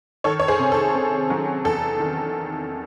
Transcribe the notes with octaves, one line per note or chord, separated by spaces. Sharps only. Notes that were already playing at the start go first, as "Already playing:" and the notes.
D#3 A4 C#5
C#5
G#4 C5
C3
A4
C4
F#3
E2 A4
D#3